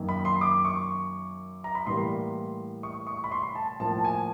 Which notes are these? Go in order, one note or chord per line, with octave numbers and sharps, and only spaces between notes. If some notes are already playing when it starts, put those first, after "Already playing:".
Already playing: F#2 D#3 F#3 A#3
B5
C6
D6
C#6
A#5
B5
A2 E3 G3 A#3 C6
C#6
C#6
B5
C6
A5
A2 F3 A#3 A5
A5
G#5